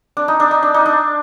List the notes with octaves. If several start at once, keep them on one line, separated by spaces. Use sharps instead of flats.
D4
D#4
D4
D#4
D4
D#4
D4